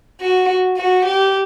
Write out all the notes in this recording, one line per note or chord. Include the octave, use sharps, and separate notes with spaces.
F#4
F#4
G4